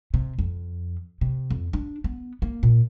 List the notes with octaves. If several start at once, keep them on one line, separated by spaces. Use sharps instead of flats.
C3
F2
C3
F2
D4
B3
A#3
A#2